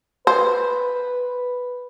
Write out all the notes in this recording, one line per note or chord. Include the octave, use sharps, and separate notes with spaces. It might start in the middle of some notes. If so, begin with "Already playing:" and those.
B4 C5